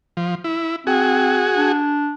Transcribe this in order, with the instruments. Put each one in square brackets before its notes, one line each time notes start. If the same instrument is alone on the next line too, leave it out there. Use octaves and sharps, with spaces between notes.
[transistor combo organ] F3
E4
[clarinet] C4 [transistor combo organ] F#4 G#4
[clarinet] D4